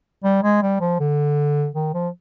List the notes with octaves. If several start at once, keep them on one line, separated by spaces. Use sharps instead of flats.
G3
G#3
G3
F3
D3
D#3
F3